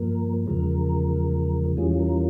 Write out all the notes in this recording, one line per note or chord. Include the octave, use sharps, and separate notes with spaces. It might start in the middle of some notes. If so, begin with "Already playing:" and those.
Already playing: G2 F3 A#3 A#4
E2 C#3 F3 G#3 A#4
E2 E3 G3 C#4 F4 G#4
A#4